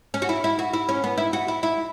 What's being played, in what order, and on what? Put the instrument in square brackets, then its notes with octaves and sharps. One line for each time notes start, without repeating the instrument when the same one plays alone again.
[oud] C#4
F#4
E4
E4
F#4
E4
C#4
B3
E4
F#4
E4
E4